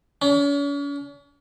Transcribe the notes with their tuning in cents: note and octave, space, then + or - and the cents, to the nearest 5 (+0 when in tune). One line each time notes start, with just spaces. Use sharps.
C#4 +40